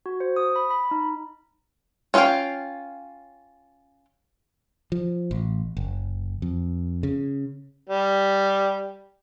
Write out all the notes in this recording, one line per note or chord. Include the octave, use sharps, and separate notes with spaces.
F#4
C5
D#6
B5
B5
D#4
C#4 F4 G#4 F5 G5
F3
A1
F#1
F2
C#3
G3